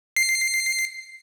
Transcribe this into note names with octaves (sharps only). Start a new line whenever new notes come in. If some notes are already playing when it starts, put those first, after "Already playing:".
C7